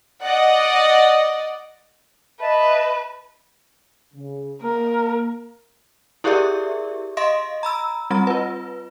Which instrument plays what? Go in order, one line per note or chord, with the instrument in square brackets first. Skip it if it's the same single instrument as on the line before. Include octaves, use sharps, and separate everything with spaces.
[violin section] D5 D#5 F#5
[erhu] B4 [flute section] D#5 E5 A5
[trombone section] C#3
[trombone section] A#3 [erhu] A#4
[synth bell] E4 G4 G#4 A#4 D5 E5
D#5 F5 C6 A#6
A#5 B5 E6
G3 C4 A#5
F4 B4